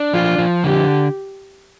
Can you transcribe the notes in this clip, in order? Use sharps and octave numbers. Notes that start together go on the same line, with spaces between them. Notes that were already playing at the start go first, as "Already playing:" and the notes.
Already playing: D4
F3 F4
F3
D3 G4